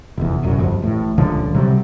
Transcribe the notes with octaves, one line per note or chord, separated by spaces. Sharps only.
F1 E2
D#1 C2 F#2 F#3
G1 F2
A1 A2
D#1 C#2 D3 F3
C3 F#3 G3